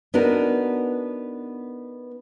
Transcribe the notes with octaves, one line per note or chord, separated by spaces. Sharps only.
B3 D4 D#4 F#4 A#4